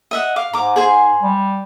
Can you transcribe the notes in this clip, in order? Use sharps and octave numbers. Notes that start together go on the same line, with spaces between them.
D#5 E5 F#5
F5 D6
G#2 A#5 D6
G#4 C5 G#5
G3